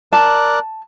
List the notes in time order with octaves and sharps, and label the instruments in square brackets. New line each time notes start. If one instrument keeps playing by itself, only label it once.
[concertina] A#4 D5 F#6 [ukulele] A5